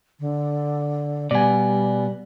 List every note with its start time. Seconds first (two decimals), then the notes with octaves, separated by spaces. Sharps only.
0.20 D3
1.31 B2 G3 B3 D5 G#5